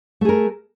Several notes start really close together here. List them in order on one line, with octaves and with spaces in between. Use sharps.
A3 G#4 A#4